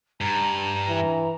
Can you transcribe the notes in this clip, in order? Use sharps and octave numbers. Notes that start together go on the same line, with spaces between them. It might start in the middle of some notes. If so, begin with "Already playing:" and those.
G2 A#5
E3